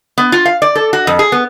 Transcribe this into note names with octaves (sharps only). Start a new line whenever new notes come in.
B3
F4
F5
D5
A4
F#4
F2
G#4
B3